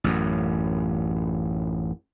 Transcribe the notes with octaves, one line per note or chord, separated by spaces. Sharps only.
A1 F#2